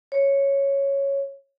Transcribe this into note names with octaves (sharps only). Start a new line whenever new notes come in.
C#5